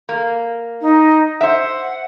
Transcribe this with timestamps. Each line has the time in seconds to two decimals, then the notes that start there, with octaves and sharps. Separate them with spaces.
0.09 A#3
0.81 D#4
1.41 C5 E5 F#5